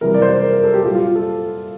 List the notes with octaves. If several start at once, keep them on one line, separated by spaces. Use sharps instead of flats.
C3 E3 G3 A#4
D5
C5
A#4
A#4
A4
G4
A#2 G3 F4
F4
A4